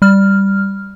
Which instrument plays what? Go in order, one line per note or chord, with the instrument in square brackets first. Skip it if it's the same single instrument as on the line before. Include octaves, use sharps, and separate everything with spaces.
[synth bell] G3 F6